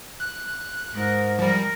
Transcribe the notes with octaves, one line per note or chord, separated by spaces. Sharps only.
F#6
G#2 G#3 A#4
F3 G3 A#4